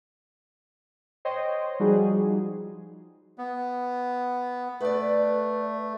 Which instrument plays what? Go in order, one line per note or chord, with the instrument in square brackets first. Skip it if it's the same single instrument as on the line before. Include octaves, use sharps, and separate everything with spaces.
[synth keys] C5 C#5 D#5 G5 C6
F3 G3 D#4 F#4 G#4
[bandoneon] B3
[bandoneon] A3 [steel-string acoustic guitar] B4 D5